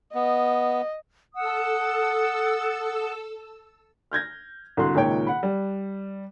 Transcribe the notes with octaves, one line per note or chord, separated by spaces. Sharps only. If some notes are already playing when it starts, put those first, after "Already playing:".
B3 D#5
A4 F#5 D#6 E6
F6 G6 G#6 A#6
C2 D3 F#4 C6 F#6
C#2 A#2 D#3 C#5 G5
F#5 B5
G3